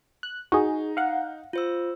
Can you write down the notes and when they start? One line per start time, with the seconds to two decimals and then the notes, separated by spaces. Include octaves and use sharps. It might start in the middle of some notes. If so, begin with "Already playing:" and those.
0.23 F#6
0.52 D#4 F#4 G#4
0.97 F5 F#5
1.53 F4 C5 E6